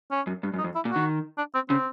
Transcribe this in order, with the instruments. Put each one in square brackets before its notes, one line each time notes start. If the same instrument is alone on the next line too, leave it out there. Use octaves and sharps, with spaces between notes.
[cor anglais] C#4
[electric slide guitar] F#2
G2
F#2
[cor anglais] D#4
[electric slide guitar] F2
[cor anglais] E4
[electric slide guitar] A#2
[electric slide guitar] D#3 [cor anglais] F#4
[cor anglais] D4
C4
[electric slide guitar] C#3 [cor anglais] C4